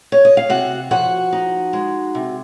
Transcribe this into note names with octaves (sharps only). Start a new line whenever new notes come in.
C#5
D#5
F5
C3 F#4 F#5
F3 F#4 F#5
D#4
G#3
C3